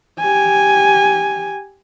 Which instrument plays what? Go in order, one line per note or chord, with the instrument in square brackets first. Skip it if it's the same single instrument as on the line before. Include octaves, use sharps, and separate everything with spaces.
[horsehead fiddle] G4 G#5